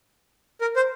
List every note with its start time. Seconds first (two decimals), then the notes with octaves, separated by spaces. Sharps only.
0.61 A#4
0.76 C5